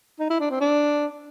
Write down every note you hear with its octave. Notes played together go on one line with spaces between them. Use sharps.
D#4
E4
D4
C4
D4